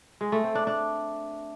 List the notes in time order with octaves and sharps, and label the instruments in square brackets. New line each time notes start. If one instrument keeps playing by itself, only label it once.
[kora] G#3
A3
C4
D4
D4